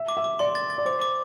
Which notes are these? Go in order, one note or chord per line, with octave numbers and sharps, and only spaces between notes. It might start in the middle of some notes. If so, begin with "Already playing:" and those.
Already playing: E5
D6
E5
D6
D5 C6
A6
A6
D5
C5 D6
D6